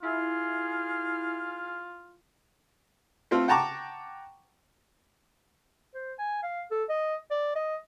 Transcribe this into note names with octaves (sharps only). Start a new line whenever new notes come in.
E4 F4 G#4 F6
A3 C4 F4 A4
F#5 G5 A5 A#5 C#6 D6
C5
G#5
F5
A4
D#5
D5
D#5